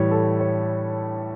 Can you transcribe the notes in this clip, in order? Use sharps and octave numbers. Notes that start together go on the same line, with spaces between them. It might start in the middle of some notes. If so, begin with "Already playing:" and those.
Already playing: A2 E3 G3 C#5
A4
C#5